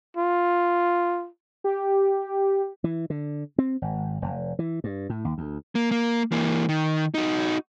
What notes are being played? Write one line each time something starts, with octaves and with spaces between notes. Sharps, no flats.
F4
G4
E3
D3
C4
G#1
F1
E3
G2
A2
D#2
D2
A#3
A#3
E3 A#3
D#3
D#4 F#4